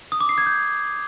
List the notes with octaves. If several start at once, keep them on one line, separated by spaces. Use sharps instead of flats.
D#6
D6
C7
G#6
G6